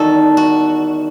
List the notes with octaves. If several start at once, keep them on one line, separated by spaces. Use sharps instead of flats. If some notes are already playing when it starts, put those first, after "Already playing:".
Already playing: E2 D#3 G3 D#4 F#4 A4
F#4